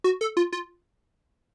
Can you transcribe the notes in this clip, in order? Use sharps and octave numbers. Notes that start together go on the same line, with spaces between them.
F#4
A4
F4
F4